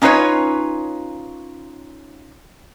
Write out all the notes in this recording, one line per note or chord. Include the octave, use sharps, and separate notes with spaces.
C#4 D#4 F4 B4 C#5